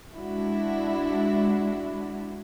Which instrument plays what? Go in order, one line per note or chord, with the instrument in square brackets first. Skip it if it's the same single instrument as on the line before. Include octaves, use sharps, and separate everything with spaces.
[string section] G#3 D4 E4 F#4